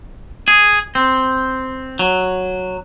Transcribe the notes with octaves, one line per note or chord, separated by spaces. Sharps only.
G#4
C4
F#3